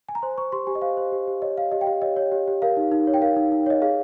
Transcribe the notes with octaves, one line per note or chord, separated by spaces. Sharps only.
G#5
A#5
C5 C6
C5 C#6
G4 C6
G4 G#5
D#5
C5 F5
C5
G4
G4
C#5 D#5
C#5 F5
G4 D#5
G5
G4 F5
C#5 D#5
C#5
G4
G4
A#4 F5
D#4
D#4
C#5
G5
A#4 F5
D#4
D#4
C#5 D#5
G#4 F5